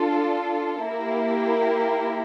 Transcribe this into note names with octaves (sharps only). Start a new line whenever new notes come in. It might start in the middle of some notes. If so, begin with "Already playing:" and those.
Already playing: D4 F4 A4
A#3 E4 G4 A#4